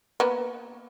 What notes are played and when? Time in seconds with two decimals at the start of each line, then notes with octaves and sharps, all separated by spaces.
0.20 A#3 B3